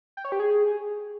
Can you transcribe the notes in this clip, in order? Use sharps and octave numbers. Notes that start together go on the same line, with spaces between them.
G5
C#5
G4
G#4